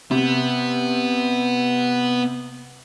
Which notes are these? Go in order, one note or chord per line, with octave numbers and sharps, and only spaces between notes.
C3 B3